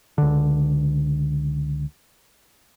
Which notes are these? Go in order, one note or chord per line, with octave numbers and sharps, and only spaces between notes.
C#2 D3